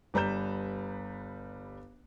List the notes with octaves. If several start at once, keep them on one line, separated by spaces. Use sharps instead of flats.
G1 G3 B4 A#5 G6 E7